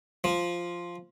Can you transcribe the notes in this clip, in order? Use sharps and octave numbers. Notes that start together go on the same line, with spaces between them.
F3